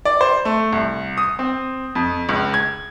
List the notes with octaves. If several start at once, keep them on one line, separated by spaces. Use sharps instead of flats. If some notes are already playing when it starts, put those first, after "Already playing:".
D5
C5
A3
C2
D#6
C4
F2
C#2
G#6